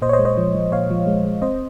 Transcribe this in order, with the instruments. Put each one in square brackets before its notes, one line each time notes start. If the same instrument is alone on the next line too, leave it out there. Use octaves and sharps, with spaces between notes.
[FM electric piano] A#2 C5 D#5
C#5
C5 D#5
G#3
C5 D#5
F3
F3
A#2 C#5 F5
F3
G#3
G#3
C4 C5 D#5